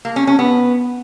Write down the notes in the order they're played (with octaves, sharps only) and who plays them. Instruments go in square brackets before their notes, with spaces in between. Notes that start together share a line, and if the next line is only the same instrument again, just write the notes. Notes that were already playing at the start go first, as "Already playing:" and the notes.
[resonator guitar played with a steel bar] A#3
C#4
C#4
B3